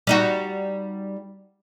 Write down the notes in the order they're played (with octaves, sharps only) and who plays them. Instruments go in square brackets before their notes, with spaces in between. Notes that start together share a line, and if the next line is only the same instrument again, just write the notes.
[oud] G3 D#4 F#4